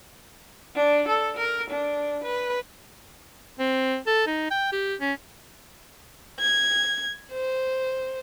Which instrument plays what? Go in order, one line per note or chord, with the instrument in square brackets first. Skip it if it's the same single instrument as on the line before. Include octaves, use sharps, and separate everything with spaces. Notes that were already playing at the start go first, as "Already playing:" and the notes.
[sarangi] D4
A4
A#4
D4
B4
[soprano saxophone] C4
A4
D#4
G5
G4
C#4
[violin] G#6
C5